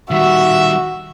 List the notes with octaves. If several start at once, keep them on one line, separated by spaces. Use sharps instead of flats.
D#3 G3 F#4 E5